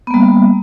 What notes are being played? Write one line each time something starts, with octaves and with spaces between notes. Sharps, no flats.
G3 A#3 B3